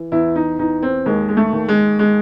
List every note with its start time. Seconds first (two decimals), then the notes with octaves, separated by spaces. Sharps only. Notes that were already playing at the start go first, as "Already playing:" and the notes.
Already playing: E3
0.12 E2 E4
0.36 D#4
0.59 E2 D#4
0.83 C4
1.06 D#2 G#3
1.28 G#3
1.37 A3
1.53 D#2
1.68 G#3
1.99 G#3